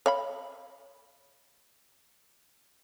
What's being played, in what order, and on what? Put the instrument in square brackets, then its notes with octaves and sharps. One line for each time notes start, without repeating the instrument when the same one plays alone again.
[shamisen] C#5 F5 B5